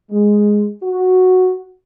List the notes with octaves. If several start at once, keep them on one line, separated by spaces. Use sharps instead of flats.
G#3
F#4